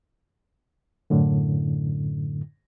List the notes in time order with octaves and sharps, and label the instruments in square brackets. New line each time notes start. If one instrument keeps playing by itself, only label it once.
[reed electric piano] F#2 A2 D3